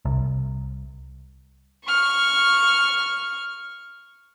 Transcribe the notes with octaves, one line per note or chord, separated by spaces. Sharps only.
C2
C#6 F6